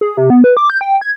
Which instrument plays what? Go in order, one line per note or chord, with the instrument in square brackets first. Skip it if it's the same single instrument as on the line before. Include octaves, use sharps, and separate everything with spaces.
[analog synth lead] G#4
C3
B3
B4
D6
G6
G5
G#6